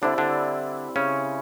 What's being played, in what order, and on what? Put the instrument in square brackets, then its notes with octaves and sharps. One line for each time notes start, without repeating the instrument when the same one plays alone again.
[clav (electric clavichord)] D3 D4 [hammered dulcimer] G3 C4 E4
[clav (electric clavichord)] D3 D4
C#3 C#4